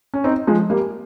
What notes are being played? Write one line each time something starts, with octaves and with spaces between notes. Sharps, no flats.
C#4
C4 D#4
F3 G#3
G3 A#3